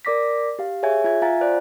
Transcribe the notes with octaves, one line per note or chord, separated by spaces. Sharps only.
A#4 D5 D6 A#6 B6
G4 F5
G#4 C#5 E5 G#5 G#6
F4 E5 G#6
F4 F5 F#5 G#5 A#5 A6
C5 D5 F#6